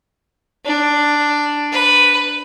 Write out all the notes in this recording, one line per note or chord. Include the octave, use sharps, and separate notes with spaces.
D4
B4